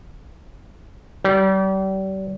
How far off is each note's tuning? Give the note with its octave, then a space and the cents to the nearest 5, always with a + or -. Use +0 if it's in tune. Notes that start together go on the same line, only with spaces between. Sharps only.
G3 -35